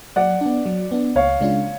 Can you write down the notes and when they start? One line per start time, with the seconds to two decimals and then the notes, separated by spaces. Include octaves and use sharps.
0.16 F#3 D5 F#5
0.41 B3 D4
0.66 F#3
0.91 B3 D4
1.15 C#2 C#5 F5
1.41 C#3 G#3 D4 F4